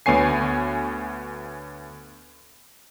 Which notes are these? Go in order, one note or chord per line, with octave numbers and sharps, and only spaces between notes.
D2 B3 C#5 G#5 C7